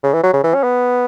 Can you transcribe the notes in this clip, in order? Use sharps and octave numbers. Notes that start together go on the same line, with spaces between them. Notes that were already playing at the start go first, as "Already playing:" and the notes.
C#3
E3
F#3
C#3
E3
C#4
B3